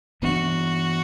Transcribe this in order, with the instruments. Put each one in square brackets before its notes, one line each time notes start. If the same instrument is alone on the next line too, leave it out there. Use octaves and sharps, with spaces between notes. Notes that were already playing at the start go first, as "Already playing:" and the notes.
[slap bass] G2 E3 B3 D4 [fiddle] F#4